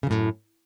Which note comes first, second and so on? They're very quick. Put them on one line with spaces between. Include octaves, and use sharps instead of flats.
C#3 F#2 A2